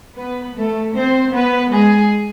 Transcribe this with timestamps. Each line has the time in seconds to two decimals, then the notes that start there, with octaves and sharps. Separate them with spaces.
0.17 B3 B4
0.56 A3 A4
0.95 C4 C5
1.33 B3 B4
1.73 G#3 G#4